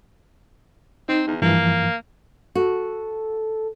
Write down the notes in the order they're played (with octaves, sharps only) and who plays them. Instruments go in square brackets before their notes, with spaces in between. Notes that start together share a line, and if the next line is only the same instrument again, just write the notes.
[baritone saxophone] C4 [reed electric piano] D#4
[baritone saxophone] E2
[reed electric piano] G2 E3 F3 [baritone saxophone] A#3
[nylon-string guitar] F#4 [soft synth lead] A4